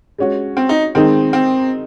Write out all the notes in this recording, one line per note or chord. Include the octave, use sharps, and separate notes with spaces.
G#3 C#4 F#4
C4
D#4
D#3 G#3 C4 D#4
C4